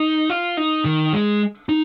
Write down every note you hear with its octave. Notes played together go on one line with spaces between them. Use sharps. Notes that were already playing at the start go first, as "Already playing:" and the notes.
Already playing: D#4
F4
D#4
D#3
G#3
D#4